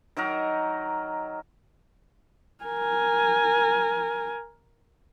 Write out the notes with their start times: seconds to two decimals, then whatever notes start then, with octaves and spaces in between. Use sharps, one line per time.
0.17 D#3 F#3 D#4 A#4
2.64 A#4 G#5